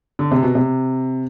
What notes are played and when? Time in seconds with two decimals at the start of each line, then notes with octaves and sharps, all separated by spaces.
0.19 D3
0.32 C3
0.43 B2
0.55 C3